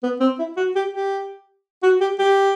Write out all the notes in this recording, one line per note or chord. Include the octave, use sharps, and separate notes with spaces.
B3
C4
E4
F#4
G4
G4
F#4
G4
G4